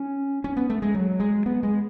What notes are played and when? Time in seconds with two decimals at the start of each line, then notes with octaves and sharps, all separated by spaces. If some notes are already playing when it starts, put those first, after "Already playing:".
Already playing: C#4
0.44 C#4
0.57 B3
0.70 A3
0.82 G#3
0.94 F#3
1.20 G#3
1.46 B3
1.63 G#3